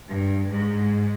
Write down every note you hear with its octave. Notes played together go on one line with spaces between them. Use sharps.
G2
G#2